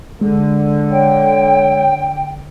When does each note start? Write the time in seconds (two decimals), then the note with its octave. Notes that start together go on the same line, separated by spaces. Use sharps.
0.21 D3 G#3
0.91 C#5 G5